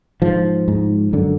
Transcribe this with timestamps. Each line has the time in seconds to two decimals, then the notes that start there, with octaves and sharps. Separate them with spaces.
0.22 G#2 F3
0.68 G#2
1.13 F#2 D3